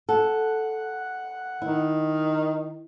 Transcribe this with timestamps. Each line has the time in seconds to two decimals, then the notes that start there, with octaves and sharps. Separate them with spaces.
0.09 A4 F#5
1.62 D#3 E4